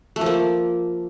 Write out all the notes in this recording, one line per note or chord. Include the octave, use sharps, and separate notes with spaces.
A3
F3
A#3